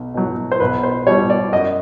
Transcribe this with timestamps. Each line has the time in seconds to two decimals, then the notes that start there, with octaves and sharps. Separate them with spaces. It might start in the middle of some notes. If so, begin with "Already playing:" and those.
Already playing: B1
0.14 B2 F#3
0.51 C5
0.60 B1 B4
0.83 C5
1.07 B2 G3 C#5
1.30 D5
1.52 F#2 D#5